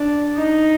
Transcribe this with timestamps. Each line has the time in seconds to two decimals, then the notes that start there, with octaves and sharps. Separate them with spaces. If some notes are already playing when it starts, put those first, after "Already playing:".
Already playing: D4
0.37 D#4